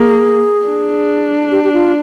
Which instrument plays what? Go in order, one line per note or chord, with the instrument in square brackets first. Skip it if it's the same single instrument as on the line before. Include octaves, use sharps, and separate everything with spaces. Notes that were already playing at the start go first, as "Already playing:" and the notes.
Already playing: [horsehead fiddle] A#3 [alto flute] G#4
[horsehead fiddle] D4
[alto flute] G4
G4
F4